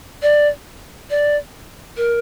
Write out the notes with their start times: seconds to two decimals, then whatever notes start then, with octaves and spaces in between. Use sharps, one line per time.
0.22 D5
1.10 D5
1.97 A#4